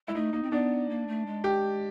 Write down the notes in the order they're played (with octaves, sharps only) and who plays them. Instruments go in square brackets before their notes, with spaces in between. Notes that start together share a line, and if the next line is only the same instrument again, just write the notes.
[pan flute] G#3 [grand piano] E4
[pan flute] A3 [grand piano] D#4
[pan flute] A#3 [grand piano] D#4
[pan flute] C4
[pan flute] B3 [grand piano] D4
[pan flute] A#3
A3
G#3
[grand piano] G4